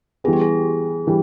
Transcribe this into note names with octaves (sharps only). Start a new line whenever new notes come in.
E3 G3 B3 G#4
G4
G#4
E3 G3